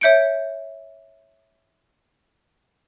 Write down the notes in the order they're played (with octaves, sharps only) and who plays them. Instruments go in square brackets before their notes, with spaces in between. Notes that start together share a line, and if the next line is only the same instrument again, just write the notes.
[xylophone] C#5 E5 G6 C#7 D7